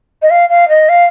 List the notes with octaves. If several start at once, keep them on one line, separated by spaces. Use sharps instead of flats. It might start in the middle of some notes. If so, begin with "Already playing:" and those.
D#5
F5
F5
D#5
F5